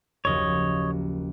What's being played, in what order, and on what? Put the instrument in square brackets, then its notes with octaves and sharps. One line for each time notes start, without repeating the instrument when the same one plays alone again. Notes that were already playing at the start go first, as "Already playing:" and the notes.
[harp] F#1 D#2 F3 [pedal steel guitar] C#5 D#5